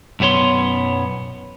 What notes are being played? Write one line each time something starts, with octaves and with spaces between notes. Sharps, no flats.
B1 F#2 B3 C#5 C6